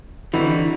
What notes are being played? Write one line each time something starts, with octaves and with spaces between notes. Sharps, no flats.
D3 E3 G3 C4 D#4 F#4